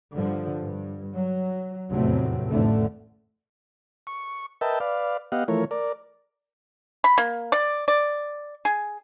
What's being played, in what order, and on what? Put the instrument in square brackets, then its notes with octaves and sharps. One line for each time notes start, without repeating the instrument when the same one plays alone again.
[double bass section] G2 D3 F3
G2
F#3
F1 E2 A2 F#3 A3 C4
A1 F2 A2 D3 A3
[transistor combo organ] C#6
A#4 B4 D#5 E5 G5 A5
B4 D5 F5
B3 G4 D#5 F5 F#5
E3 F3 A3 A#4 C#5
A#4 D5
[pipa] B5
A#3
D5
D5
G#4